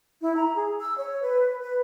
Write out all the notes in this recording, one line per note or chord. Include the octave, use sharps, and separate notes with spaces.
E4
A#5
G#4
E6
C#5
B4
B4